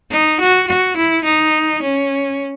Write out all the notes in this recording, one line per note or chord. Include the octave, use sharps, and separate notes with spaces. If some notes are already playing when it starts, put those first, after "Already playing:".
D#4
F#4
F#4
E4
D#4
C#4